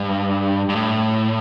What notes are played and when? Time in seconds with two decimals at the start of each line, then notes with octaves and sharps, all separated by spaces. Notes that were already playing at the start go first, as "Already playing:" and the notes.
Already playing: G2
0.69 G2
0.75 A2